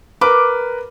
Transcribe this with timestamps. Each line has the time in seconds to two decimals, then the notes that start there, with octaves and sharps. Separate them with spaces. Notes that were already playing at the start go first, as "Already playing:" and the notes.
0.21 A#4 B4 D6